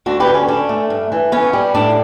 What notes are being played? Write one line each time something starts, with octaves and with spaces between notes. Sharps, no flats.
D2 D4 F#4
G4 B4
D3
C#4
C#4 D4
A3
G2
E3
B3 C#4
G3
A2 D4